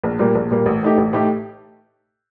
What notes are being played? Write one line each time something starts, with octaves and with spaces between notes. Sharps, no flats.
A#1
A#2 G3 A#3
A#1
A#2 G3 A#3
A1
A2 A3 D#4 G4
A1
A2 A3 D#4 G4